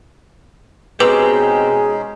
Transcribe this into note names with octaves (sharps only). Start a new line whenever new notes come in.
B2 G#3 C4 C#4 D#4 G4 G#4 B4